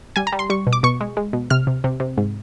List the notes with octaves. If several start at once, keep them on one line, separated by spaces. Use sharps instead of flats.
G3 G#5
A#5
G3
C6
G3 C#6
B2
D6
B2 C#6
G#3
G#3
B2
C3 F6
C3
C3
C3
G#2